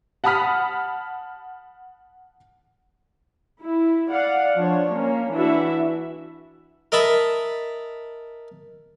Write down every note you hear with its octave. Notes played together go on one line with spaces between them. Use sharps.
F#5 A5 B5 D#6 F6 B6
E4
D5 F5 F#5
F3 D4 C#5
A#3 C#4
E3 D4 E4 F#4 E5
A#4 D#5 E5 A5 B5